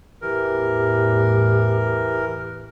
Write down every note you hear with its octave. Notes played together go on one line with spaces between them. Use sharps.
E2 A2 E3 G4 A#4